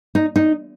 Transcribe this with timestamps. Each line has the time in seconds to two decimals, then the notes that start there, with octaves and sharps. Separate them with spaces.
0.15 D#4
0.36 D#4